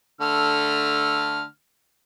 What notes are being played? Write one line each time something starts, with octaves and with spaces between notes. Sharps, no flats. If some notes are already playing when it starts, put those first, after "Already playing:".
D3 A3 F6